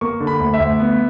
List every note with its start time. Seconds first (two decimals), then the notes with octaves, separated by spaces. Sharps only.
0.01 A#3 C#6
0.20 D3
0.27 B5
0.40 D2
0.54 E5
0.60 D2
0.80 B3